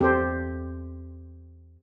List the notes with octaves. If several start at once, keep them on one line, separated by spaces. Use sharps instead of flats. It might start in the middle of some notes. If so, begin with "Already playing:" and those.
E2 C4 G4 A4 C5